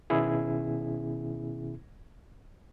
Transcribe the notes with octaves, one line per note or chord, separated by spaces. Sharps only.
B2 D#3 B3 C#4 E4 G#4